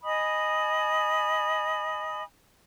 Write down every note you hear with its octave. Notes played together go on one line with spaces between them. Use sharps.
D#5 G#5 B5 D#6